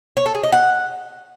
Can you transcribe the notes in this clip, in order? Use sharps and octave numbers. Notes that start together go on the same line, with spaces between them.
C#5
A4
G#4
D#5
F#5